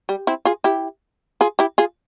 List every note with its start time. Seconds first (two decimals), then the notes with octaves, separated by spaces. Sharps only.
0.09 G3
0.27 C4 E4
0.45 F4 G#4
0.64 E4 G4
1.41 F4 G#4
1.59 E4 G4
1.78 F4 G#4